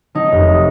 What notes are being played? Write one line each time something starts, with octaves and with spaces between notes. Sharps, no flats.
F#3 D#4
F1